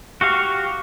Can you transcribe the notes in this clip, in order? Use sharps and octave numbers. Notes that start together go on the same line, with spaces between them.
F#4 G4 F5 C#6